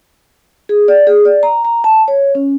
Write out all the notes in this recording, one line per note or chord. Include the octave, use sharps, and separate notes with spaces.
G#4
D5
G#4
D5
A#5
A#5
A5
C#5
C#4